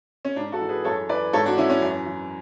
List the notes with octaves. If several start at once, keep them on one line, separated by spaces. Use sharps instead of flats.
C#4
G#2 D4
F#4 A4
E3
G#4 B4
F#2 A4 C#5
E3 B4 D5
G#2 A4 C#5
D4 F#4
E3 C#4 E4
C#4
F#2
E3